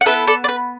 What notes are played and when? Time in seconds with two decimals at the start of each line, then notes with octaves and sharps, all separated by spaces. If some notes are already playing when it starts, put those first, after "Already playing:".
0.01 F#5
0.06 B3 E4 A4 B4 E5
0.27 A4 D5
0.44 D5
0.49 B4